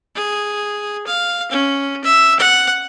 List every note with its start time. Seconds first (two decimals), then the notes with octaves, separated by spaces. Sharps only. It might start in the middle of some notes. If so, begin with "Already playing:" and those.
0.15 G#4
1.07 F5
1.51 C#4
2.04 E5
2.39 F#5